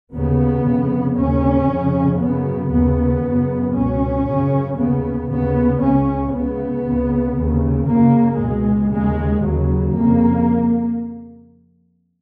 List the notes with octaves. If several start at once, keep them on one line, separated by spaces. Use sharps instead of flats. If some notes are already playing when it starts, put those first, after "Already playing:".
D#2 C#3 B3
F2 C#3
D#2 C#3 C#4
F2 C#3
F#2 C#3 B3
D#2 C#3 B3
F#2
C#3
C#2 B2 C#4
F#2 C#3
D#2 C#3 B3
D#2 C#3 B3
C#2 C#3 C#4
C#2 C#3 B3
C#2 C#3
D#2 C#3
F#2 C#3 A#3
C#2 B2 G#3
D#2 C#3 G#3
D#2 C#3 F#3
F2 C#3 A#3